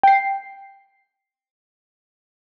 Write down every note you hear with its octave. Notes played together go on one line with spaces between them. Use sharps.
G5 C7